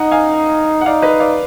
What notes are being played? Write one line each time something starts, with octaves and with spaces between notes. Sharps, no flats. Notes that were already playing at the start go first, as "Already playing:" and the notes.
Already playing: D#4 D#5 F#5
F5 G#5
F#5
D#4 D5 F5
B4 D#5
D5 F5